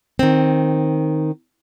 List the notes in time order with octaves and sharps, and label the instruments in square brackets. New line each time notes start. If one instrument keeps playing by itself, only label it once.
[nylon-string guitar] D#3 C4